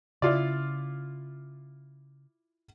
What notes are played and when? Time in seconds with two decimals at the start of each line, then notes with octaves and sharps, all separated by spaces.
0.22 C#3 E4 F4 D5